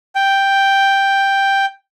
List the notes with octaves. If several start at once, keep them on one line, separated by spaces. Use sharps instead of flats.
G5